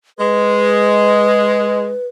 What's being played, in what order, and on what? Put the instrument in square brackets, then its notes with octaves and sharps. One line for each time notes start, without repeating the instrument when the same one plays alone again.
[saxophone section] G#3 [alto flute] B4